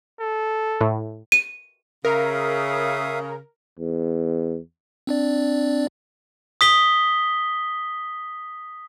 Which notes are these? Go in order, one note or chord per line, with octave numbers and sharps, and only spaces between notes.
A4
A2
D#7
C#3 A#4 E5 F5 D#6
E2
C4 D4 D5
D#6 B6 G7